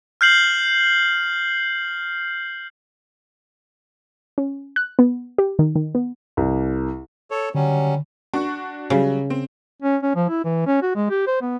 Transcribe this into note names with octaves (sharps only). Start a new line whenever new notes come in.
F6 G6 C7 F#7
C#4
F#6
B3
G4
D#3
D#3
B3
C2
A4 C#5
D3 F#3 G3 C#4
D4 F#4 C#6
C#3 F#3 G3
C4
C#4
C#4
F3
E4
E3
C#4
F#4
G#3
G4
C5
B3